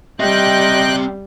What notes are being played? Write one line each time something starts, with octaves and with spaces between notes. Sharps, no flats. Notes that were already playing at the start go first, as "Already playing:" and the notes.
G3 C4 D#5 E5 G5 F#6